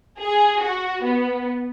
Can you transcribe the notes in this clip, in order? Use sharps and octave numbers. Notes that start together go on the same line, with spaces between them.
G#4
F#4
B3